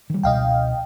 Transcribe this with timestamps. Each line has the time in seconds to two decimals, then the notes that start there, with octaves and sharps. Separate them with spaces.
0.10 D#3 G3
0.23 C#2 B2 D#5 F5 G5